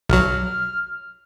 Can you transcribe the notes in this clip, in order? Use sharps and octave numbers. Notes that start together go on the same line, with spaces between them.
B1 F#3 F6